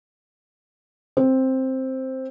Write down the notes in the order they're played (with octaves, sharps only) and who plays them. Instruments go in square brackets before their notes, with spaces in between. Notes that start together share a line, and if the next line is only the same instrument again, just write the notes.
[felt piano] C4